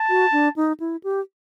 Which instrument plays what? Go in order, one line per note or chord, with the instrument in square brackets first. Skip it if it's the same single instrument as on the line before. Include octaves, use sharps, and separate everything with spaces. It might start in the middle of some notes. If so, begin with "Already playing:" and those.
Already playing: [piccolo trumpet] A5
[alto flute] F#4
D4
D#4
E4
G4